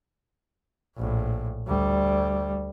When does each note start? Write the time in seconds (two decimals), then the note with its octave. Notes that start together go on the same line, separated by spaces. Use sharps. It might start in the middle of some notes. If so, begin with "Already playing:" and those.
0.96 A#1 A2
1.68 D2 G3